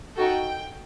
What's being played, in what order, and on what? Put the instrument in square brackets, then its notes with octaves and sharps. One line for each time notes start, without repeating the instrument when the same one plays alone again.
[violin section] D#4 F#4 A4 G5